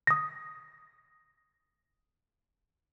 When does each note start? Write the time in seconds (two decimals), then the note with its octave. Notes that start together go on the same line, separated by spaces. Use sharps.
0.07 D#6 A#6